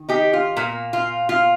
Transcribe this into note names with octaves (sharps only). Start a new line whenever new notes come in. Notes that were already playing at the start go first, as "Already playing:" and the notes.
Already playing: D#3
D#4 G4
F4
A#2 A#3
F4
F4